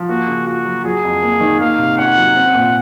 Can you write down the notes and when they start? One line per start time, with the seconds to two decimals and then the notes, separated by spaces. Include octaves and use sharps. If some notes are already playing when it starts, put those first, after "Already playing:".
Already playing: F3
0.09 A#3 F#4
0.27 C#3
0.46 F4 F#4
0.65 F#3
0.84 F#3 G#4
1.04 F2
1.23 A#3
1.40 D#3
1.60 A#3 F5
1.79 C3
1.98 C#4 F#5
2.17 F#3
2.35 C4
2.55 A#2